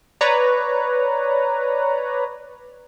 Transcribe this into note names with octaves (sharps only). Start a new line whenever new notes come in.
B4 C#5 D5 A#5